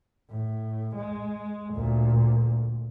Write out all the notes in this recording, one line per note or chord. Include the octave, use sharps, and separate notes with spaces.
A2
G#3
D2 A#2